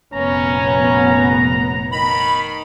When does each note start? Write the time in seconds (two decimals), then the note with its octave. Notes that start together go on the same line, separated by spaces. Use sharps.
0.13 F1 A#2 B3 C#4 A#5
1.92 D#3 B5